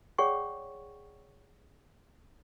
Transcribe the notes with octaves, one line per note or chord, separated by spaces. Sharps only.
G#4 C#5 D5 F#5 G5 C#6